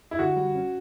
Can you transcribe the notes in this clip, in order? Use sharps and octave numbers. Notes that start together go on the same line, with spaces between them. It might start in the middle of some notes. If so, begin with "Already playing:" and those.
E4
D3 F#4
G3
C#4